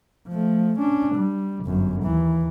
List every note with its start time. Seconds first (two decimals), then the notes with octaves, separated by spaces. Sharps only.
0.28 F3 A3
0.79 C#4 D4
1.15 G3
1.65 G1 F#2
2.03 D#2 E3